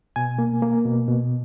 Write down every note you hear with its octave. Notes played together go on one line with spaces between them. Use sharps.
B2 G#5
A#3
A#3
B2
B2